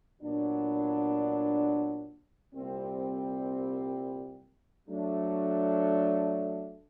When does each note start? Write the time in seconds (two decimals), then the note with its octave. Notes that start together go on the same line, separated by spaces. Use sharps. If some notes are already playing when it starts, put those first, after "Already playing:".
0.21 A#2 F#3 B3 D4
2.54 C2 A#2 G3 C4
4.89 F#3 A3 D4